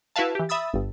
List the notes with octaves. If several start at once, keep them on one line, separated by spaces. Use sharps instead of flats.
E4 F#4 B4 E5 F5 A5
E3 G4
E5 B5 D#6 E6 A6
G1 G2